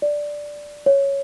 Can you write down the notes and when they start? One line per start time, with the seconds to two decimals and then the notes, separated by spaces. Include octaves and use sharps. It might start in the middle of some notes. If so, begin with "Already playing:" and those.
0.02 D5
0.86 C#5